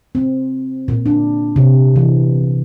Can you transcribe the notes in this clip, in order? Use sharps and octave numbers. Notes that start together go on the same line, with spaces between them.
C4
A#2
D4
C3
E3